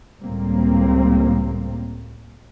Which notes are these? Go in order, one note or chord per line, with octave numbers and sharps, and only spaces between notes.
C#2 A2 G3 A#3 C4